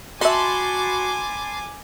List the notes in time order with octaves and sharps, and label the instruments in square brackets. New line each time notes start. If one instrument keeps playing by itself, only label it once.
[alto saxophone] F#4 [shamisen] D#5 E5 [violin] G#5 D6 [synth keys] A5 B5 C6